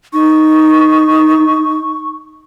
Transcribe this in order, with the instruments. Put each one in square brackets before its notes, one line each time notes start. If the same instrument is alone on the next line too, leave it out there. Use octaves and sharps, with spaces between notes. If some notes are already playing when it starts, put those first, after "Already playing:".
[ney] D#4 [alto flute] C#6